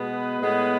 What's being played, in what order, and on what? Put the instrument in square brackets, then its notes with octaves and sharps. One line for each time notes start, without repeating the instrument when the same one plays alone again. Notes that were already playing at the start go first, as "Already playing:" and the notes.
Already playing: [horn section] B2 G#3 B3
B4
A2 G#3 B3